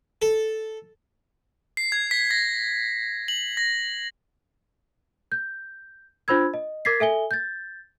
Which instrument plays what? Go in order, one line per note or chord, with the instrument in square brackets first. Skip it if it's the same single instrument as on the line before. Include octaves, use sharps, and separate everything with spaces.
[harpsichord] A4
[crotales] C7
G#6
B6
A#6
F#7
A#6
[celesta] G6
D4 F4 C5 B5 E6 G#6
D#5
A#4 D6 G#6 A6 B6 C7
A4 E5 G#5 G7
G6 A6